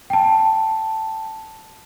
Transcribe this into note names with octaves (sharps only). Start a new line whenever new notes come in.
G5 A5